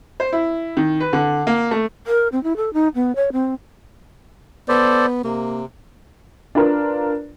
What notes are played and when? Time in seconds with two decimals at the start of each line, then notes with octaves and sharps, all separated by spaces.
0.20 C5
0.33 E4
0.77 D#3
1.00 B4
1.13 D3
1.47 A#3
1.71 A3
2.07 A#4
2.32 C4
2.43 E4
2.57 A4
2.74 D#4
2.95 B3
3.16 C#5
3.32 C4
4.69 B3 A4 C5 D5
5.23 C3 A#3
6.55 D4 F4 A#4 B4